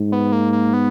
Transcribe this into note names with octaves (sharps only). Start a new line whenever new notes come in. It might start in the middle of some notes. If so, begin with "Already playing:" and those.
Already playing: G#2
B3
A#3
A#3
B3